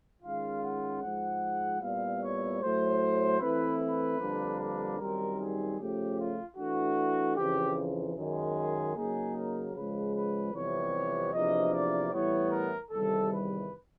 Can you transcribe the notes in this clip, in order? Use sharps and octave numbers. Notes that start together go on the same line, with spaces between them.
D#3 G#3 C#4 F4 F5
F#5
G#2 F3 G#3 F#5
A#2 G3 B3 E4 F5
C#5
A2 F#3 A3 C5
E3 A3 C4 E4 B4
B4
F2 D3 G3 A#3 D4
B4
F#2 D#3 G3 C4 D#4 A#4
G#4
C#3 F3 A3 C#4 G4
F4
E3 A3 D4 F#4
F2 C#3 E3 G4
F#2 D#3 G#3 G#4
C#3 F#3 A#3 D#4 G#4
A#4
C#3 F3 G#3 B4
B4
F2 C3 E3 G3 B3 C#5
E2 C3 F3 A#3 D4 D#5
D5
A2 E3 G3 B3 C#5
A#4
E2 C3 D#3 G3 A4
B4